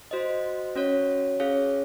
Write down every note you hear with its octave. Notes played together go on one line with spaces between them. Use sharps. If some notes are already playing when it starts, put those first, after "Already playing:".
F#4 C5 D#5
C#4 F#4 C#5
C#4 G#4 C#5 F5